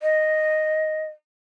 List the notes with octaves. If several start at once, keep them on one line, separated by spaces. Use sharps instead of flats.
D#5